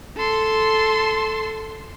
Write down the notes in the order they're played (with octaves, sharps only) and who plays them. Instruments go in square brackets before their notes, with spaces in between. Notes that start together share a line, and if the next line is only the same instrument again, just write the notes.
[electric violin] A4 C6